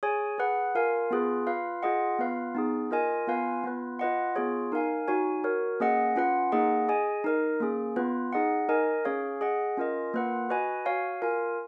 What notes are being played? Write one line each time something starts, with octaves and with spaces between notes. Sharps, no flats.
G#4 C#5 G#5
G#4 B4 F#5
F4 A#4 F5 G#5
B3 F4 G#4 B4
F4 B4 F5
F4 G#4 D#5 F#5
B3 F4 B4 F5
B3 D#4 G#4
F4 A#4 D#5 G#5
B3 F4 B4 F5 G#5
B3 F4 B4
F4 B4 D#5 F#5
B3 F4 G#4 C#5
D#4 A#4 F5 G#5
D#4 F#4 C#5 G#5
F#4 A#4 C#5
A#3 C#4 G#4 D#5 F#5
C#4 F4 B4 F#5
A#3 D#4 G#4 D#5 F#5
G#4 D#5 G#5
D#4 A#4 D#5
A#3 C#4 G#4
B3 F4 B4
D#4 G#4 D#5 F#5
D#4 A#4 D#5 G#5
C#4 G#4 C#5 F5
G#4 D#5 F#5
C#4 F4 A#4 D#5
A#3 F4 B4 F#5
F#4 B4 D#5 G#5
F#4 C#5 F5 G#5
F4 A#4 F5 G#5